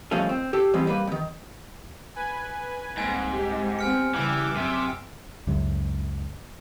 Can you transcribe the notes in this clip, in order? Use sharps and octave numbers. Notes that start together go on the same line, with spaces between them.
G2 B2 D#3 F3 A3 C#4
C4
G4 A4
E3 G3 G#3 B3 C4
G3 A#3 B4
C3 D#3
B4 G#5
C2 G#2 A#3 C4 G#5
G4
B3 C4 G#5 F6 C#7
C#3 E3 G3 D6 E6
F#1 F#2 C3 F#3
C#2 F#2